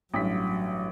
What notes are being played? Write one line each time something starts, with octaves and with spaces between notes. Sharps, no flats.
A1 G2 F#3 B6